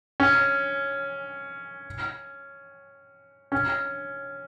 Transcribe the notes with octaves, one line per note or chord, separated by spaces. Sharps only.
C#4
C#4